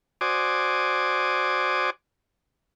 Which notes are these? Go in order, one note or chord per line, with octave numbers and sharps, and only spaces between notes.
F#4 C5 D5 G#5 D6 D#6